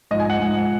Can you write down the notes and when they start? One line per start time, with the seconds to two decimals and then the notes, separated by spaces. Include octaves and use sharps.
0.11 G#2 F3 D#5
0.20 G#5
0.30 F#5
0.39 G#2 F3